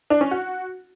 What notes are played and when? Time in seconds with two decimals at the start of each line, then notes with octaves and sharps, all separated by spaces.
0.10 D4
0.21 C#4
0.31 F#4